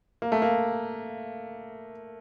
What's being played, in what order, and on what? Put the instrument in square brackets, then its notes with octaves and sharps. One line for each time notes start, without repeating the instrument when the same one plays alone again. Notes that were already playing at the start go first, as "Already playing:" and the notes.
[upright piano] A#3
A3
A#3